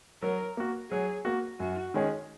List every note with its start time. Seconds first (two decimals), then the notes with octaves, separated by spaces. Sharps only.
0.22 F#3 A#4
0.57 A#3 F#4
0.91 F#3 G#4
1.25 A#3 F#4
1.60 F#2 F#4
1.94 D#3 G#3 C#4 G#4